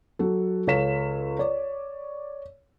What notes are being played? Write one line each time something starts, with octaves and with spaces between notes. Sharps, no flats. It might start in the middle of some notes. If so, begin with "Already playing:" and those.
F#3 F#4 A4
C#2 A4 C#5 F5 B6 E7
C#5 D5